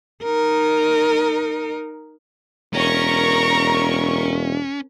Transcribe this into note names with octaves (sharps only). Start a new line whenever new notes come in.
D#4 A#4
E1 C#4 A#4 A#5 C#6